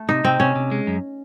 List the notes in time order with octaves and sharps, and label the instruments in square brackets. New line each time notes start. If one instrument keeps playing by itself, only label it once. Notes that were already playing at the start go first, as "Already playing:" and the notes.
Already playing: [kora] A3
[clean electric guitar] C3 [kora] D#4
[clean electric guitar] C3 [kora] C4
[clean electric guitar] C3 [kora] C#4
[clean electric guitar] C3
G#3
F#2